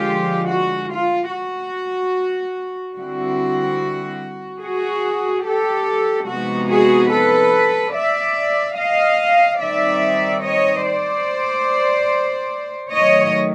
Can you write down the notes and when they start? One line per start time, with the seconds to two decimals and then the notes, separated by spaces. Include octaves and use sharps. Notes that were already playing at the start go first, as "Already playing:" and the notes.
Already playing: D3 F3 G#3 F4 G4
0.46 F#4
0.89 F4
1.30 F#4
2.96 D3 G3 C4 E4 F#4
4.62 F#4 G#4
5.45 G4 A4
6.28 C3 F3 G#3 B3 D#4 F#4
6.69 F#4 G#4
7.11 A4 B4
7.94 D5 E5
8.77 D#5 F5
9.60 D#3 G3 C4 D#4 D5 E5
10.43 C#5 D#5
10.85 C5 D5
12.93 D#3 F#3 A3 C#5 D#5